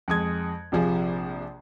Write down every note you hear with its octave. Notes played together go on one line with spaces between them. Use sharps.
F2 G#3 D#6 G#6
A#1 C3 F3 G#4